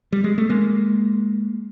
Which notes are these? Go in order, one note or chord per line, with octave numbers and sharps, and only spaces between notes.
G3
G#3
A3
G#3 A#3